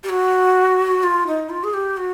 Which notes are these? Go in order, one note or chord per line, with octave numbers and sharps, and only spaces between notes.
G4
F#4
F4
D#4
F4
G#4
G4
F#4